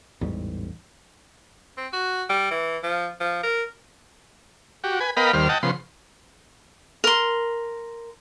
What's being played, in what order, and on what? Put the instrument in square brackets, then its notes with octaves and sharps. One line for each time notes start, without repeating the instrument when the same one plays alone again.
[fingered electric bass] A1 E2 G#2 G3
[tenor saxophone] C4
F#4
G3
E3
F3
F3
A#4
[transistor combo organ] F#4 G4
B4 G#5
B3 A#4 D#5 F5 G5 B5
D#2 G3 C5 F6
D#5 F#5 G5 A5
C#3 F3 B3 C6
[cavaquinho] A#4 C6